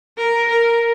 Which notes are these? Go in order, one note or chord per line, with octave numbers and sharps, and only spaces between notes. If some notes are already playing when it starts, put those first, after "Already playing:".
A#4
A#4